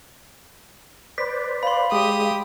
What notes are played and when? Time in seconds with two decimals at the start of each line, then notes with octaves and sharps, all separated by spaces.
1.18 B4 C5 D5 B6
1.63 F5 B5 C6
1.92 G#3 G4 D#6